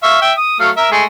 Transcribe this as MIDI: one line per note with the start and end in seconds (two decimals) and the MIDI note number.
0.03 0.19 76
0.03 0.19 77
0.03 0.19 85
0.22 0.33 76
0.22 0.33 79
0.37 0.59 87
0.60 0.70 54
0.60 0.70 57
0.60 0.70 77
0.77 0.91 70
0.77 0.91 76
0.91 1.04 56
0.91 1.04 57
0.91 1.04 68